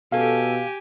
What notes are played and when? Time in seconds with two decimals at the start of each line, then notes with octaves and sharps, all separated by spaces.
0.12 B2 C#4 G4 A4 F5 G#5